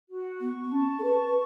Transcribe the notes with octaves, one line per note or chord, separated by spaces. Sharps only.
F#4
B3 C#6
B3
C#4 A5
A4
B4 C#6
B4